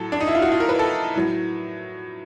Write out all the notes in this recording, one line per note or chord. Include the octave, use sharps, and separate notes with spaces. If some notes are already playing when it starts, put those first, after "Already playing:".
Already playing: A2 F#3 A4
D4
D#4
E4
F4
F#4
F4
A#4
B4
A4
A2 F#3